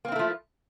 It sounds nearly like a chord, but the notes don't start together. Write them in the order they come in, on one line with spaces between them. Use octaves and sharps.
A#3 C4 E4 A3 F3